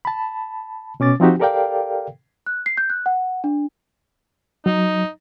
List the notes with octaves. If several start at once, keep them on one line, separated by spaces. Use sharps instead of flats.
A5 B5
B2 C#4 D6 A6
F3 C4 D#4 F#4 G4
G4 A4 A#4 D5 F5 G5
F#6
C7
G6
F#6
F#5
D4
F#3 D#4